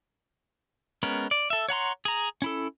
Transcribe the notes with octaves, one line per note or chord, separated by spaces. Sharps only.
G#3 B3 C#4 A#4
D5
A4 E5
C#5 F#5 A#5 C6
G#4 A#5
C#4 E4 A4